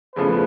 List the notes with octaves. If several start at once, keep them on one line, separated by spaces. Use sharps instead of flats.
E2 C#3 F3 A3 C#4 B4